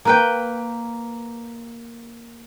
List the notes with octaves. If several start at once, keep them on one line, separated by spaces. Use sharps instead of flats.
A#3 B4 G5